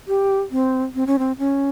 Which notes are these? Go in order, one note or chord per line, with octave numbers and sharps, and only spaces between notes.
G4
C4
C4
C#4
C4
C#4